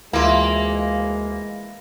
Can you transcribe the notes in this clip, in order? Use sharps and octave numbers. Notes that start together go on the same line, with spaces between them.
D2 E3 G#3 A#3 F4